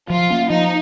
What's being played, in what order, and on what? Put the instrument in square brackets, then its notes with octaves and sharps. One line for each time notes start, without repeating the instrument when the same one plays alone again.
[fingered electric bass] F3 [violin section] F4
[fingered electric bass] A#3 C#4
[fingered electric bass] F3 [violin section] D#4